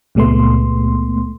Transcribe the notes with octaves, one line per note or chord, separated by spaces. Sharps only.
C#2 A#2 G#3 A3 B3 C6